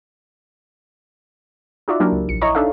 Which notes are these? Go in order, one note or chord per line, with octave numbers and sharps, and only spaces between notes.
D#4 F4 F#4 D5 E5
F#3 A#3 D4 E4 G4 A#4
C#2
A#1 C#7
E4 C#5 D#5 A#5 C#6
D4 D#4 A4 E5 F5